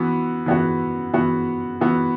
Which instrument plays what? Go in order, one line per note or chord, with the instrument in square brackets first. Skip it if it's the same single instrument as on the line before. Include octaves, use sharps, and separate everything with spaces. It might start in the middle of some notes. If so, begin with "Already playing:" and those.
Already playing: [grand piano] E3 B3 F#4
E3 B3 F#4
E3 B3 F#4
E3 B3 F#4